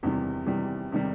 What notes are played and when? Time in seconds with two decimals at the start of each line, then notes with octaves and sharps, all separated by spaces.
0.03 E2 C3 D#3 G3
0.46 E2 C3 D#3 G3
0.92 C3 D#3 G3